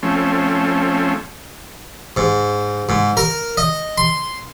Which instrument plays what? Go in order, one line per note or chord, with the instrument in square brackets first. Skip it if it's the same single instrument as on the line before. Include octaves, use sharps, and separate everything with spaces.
[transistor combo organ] F3 A3 C4 C#4
[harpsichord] G#2
G#2
A#4
D#5
C6